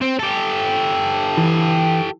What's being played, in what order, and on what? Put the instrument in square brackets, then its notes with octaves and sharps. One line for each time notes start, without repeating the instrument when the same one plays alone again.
[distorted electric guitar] C4
G4 A4
[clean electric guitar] E3